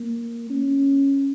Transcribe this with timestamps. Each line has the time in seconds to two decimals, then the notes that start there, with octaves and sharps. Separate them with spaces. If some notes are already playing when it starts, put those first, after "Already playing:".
Already playing: A#3
0.50 C#4